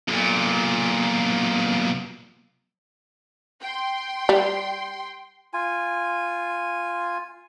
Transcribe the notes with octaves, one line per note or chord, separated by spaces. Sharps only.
B1 A#2
G5 C6
G3
F4 G#5